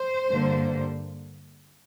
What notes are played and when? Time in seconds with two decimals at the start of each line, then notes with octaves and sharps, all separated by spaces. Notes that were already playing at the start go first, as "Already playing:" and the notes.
Already playing: C5
0.29 G2 D3 G3 A#3